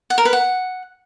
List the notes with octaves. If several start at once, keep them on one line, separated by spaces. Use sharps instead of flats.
F#5
A#4
B4
F#5